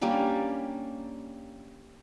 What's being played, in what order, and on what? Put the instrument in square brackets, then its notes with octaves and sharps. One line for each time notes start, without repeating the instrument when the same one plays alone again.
[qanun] G3 A#3 C#4 D4